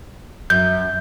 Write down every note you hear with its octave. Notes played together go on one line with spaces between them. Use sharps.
F#2 G6